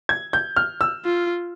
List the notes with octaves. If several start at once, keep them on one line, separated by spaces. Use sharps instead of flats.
G#6
G6
F6
E6
F4